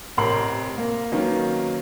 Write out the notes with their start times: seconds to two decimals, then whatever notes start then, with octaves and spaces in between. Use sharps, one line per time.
0.17 A1 C3 A#4 A#5 C6 F#7
0.78 A#3
1.12 D#3 F#3 A#3 B3 C#4